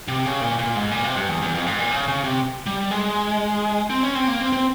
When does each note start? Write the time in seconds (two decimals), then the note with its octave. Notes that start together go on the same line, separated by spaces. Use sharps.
0.08 C3
0.25 C#3
0.41 A#2
0.59 A#2
0.75 G#2
0.91 A#2
1.04 C3
1.16 G2
1.28 E2
1.42 E2
1.55 F2
1.67 G#2
1.79 A#2
1.91 C#3
2.08 C#3
2.24 C3
2.66 G3
2.91 G#3
3.90 C4
4.03 C#4
4.15 C4
4.28 A#3
4.41 C4
4.53 C4